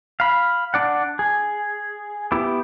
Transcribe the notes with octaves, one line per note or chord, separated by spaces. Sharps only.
F5 B5
D4 D5 F#5
G#4
B3 E4 G4